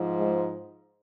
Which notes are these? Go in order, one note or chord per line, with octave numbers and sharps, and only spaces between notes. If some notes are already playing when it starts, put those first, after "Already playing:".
Already playing: G#2 F3
G#3